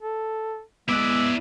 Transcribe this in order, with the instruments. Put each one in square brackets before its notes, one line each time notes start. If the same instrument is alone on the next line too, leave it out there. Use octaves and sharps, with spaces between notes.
[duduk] A4
[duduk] G#3 [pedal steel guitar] B3 F#6 [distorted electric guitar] E4 D5 [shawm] E5